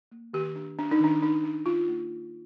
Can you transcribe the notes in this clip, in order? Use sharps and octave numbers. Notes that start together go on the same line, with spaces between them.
A#3
D#3 G4
D4
D4
D#4
D#3 D4
D#3 D#4
D4
D4 F4
A#3